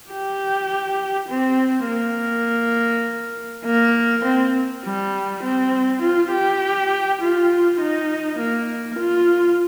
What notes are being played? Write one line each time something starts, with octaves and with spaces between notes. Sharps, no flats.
G4
C4
A#3
A#3
C4
G3
C4
F4
G4
F4
D#4
A#3
F4